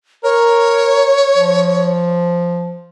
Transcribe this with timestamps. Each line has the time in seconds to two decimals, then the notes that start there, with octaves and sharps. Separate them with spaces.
0.24 A#4 C#5
1.37 F3